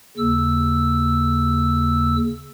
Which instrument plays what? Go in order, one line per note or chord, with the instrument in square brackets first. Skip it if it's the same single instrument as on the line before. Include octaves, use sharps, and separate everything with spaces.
[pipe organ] D#2 C#3 E6